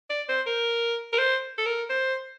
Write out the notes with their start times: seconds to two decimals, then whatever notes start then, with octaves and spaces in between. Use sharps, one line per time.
0.10 D5
0.29 C5
0.46 A#4
1.13 A#4
1.19 C5
1.58 A4
1.66 A#4
1.90 C5